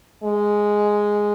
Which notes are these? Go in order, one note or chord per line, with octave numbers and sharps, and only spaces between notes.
G#3